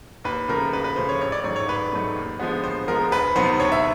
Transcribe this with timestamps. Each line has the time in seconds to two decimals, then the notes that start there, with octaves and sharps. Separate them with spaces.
0.24 D#2 B4
0.48 C#3 F3 A3 A#4
0.73 D#2 B4
0.84 B4
0.96 C#3 F3 A3 C5
1.09 C#5
1.21 A1 C#5
1.32 D5
1.44 G#2 D#3 F#3 A3 C#5
1.56 C#5
1.68 A1 B4
1.93 G#2 D#3 F#3 A3
2.16 D#2
2.40 D3 F3 G#3 B3
2.64 D#2 C5
2.88 D3 F3 G#3 B3 A#4
3.12 D2 B4
3.35 C3 D#3 F#3 B3 C5
3.59 D2 C#5
3.72 E5